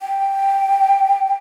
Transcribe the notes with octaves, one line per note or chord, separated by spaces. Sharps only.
G5